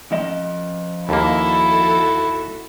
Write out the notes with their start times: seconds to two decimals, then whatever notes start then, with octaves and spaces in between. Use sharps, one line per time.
0.12 F3 D#5
1.09 D#2 A#3 E4 F#4 A4